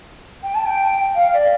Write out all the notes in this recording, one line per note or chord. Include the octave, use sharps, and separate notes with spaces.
G5
A5
G5
F5
D5